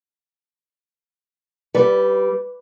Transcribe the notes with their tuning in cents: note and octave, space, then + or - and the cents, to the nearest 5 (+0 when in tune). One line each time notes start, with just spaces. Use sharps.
G3 -15 B4 +0